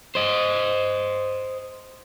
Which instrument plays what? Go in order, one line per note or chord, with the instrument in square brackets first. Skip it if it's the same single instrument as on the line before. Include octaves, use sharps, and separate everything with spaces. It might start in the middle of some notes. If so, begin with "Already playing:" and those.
[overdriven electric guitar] C5 D#5